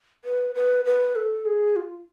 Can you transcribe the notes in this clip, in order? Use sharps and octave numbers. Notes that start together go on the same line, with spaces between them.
B4
B4
B4
A4
G#4
F4